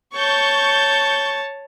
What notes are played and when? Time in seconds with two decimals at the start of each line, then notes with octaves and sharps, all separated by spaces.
0.16 C#5 A5 C#6 G6